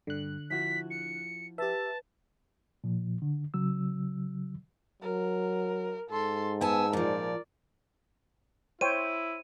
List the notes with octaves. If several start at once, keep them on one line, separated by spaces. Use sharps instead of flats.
G2 D3 F#6
F3 E4 F#4 B6
C#7
G4 B4 E5 A5
A#2 F3
D3
C#3 F#3 E6
F#3 A#4
G#2 A4 C6
B3 G#5 A5 E6
A#2 F3 A#4 D5
E4 C5 C#5 G5 D#7